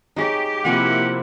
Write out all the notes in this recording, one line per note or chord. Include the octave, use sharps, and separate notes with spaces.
D#4 G4 G#4 C#5
C3 F3 A#3 E4 F#5 G#5